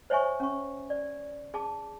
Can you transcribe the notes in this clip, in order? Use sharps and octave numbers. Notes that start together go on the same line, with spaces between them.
C5 C#5 E5 G#5 C#6
C#4 C#6
D5
G#4 A5 D6